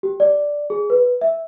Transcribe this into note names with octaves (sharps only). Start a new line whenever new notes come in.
G4
D5
G#4
B4
E5